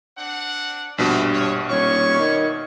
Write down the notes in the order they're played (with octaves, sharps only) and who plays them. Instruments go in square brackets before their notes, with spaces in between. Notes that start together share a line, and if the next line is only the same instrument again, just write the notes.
[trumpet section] C4 D4 F#5
[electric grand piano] A#1 B2 [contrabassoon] G2 [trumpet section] A3
[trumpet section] C#5
[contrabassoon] D#1 [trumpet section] G3 C#6 [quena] C#5
[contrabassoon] D#3